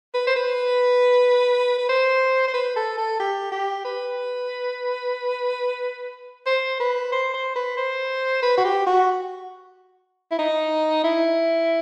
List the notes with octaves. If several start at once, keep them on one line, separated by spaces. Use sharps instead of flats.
B4
C5
B4
B4
C5
C5
B4
A4
A4
G4
G4
B4
C5
B4
C5
C5
B4
C5
B4
F#4
G4
F#4
E4
D#4
E4